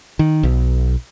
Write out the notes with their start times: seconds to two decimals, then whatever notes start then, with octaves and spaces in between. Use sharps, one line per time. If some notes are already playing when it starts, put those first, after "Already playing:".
0.19 D#3
0.43 B1